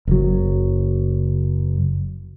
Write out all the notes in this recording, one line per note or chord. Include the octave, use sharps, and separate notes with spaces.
F#1 F#3